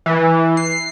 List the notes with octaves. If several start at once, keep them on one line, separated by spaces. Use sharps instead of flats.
E3
C7